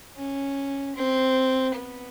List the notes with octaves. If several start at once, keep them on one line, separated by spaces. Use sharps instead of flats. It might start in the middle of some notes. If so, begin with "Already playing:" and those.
C#4
C4
B3